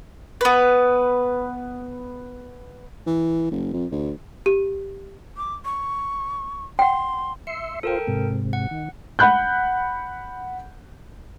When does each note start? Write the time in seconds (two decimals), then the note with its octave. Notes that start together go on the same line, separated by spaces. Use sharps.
0.41 B3 B4
3.06 E3
3.51 F#1
3.73 F2
3.92 D2
4.46 G4
5.37 D6
5.65 C#6
6.79 F#5 G5 C6
7.47 E5 C6 C#7
7.83 F4 A4 A#4 C5 G5
8.07 G#2 C3
8.53 F#5
8.71 D#3
9.19 F#5 B5 F#6 G6